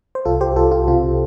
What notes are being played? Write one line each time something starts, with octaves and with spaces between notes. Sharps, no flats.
C5
C2 F4 A4
G4 C5
C2 F4 A4
F4
C3 F4